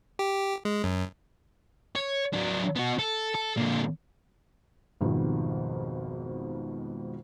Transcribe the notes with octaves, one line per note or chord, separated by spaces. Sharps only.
G4
G#3
F#2
C#5
F#3 D4
B3 F#4
A4
A4
A#2 D3
G#1 F2 G#2 B2 D#3 G3